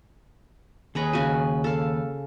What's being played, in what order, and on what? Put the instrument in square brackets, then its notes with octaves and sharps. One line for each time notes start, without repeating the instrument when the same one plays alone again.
[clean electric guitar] D#2 B4 [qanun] G#4 C#5 A#5
[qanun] C#3 F#4 G#5
A4 F5